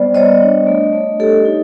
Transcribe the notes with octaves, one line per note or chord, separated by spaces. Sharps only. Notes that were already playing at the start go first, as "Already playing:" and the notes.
Already playing: G3 B3 C5 D5
G3 C#5 D#5
D4
A3
A3
A3 G4 A4
D#4